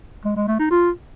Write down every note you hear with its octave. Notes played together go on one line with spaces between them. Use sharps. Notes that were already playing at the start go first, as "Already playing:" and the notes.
G#3
G#3
A3
D#4
F4